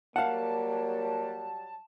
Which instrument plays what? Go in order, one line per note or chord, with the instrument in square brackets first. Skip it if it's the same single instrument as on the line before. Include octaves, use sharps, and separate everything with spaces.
[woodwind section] F#3 G3 [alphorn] A#3 [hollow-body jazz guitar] F5 F#5 [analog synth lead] A5